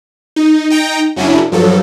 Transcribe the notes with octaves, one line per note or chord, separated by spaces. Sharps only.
D#4
D#4 G5 A#5
F#2 C#3 F#3 C#4 D4 E4
G2 F3 F#3 A4